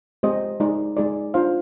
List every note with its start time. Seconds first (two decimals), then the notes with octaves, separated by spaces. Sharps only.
0.23 G#3 C4 G4 C5 D#5
0.60 G#3 D#4 G#4 D5
0.97 G#3 D#4 G#4 D5
1.34 D4 F4 C5 F5